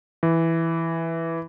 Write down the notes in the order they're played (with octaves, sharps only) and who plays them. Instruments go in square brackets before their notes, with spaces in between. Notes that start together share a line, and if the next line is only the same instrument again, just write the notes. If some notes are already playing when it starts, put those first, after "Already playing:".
[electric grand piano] E3